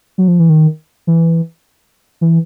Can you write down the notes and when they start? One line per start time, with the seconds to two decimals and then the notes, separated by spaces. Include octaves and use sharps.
0.18 F#3
0.28 F3
0.39 E3
0.49 D#3
1.07 E3
2.21 E3